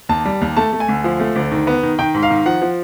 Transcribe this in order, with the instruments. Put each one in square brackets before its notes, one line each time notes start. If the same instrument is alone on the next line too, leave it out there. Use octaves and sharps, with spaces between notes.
[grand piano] D#2 A5
G3
D#2
A3 A5
A3
G#5
D2
F3
A3
D2
D#3
B3
D#3
D#3 G5
G#2
F5
D#3
F3 F#5
F3